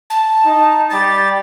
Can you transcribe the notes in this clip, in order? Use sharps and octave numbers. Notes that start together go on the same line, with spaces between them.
A5
D#4
G3 G4 B5 A6